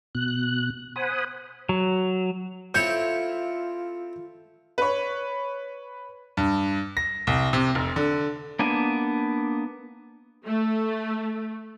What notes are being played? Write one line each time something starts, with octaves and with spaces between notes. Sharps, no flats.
B2 F#6
C5 F#5 G#5 B5 D#6
F#3
A3 C4 E4 F4 C#5 G6
B4 C#5
G2
A#6
C2
C3
F1
D3
A#3 B3 D4 G#5
A3